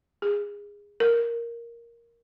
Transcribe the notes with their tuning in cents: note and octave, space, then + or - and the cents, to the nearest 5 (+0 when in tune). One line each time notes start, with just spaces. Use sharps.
G#4 -20
A#4 +5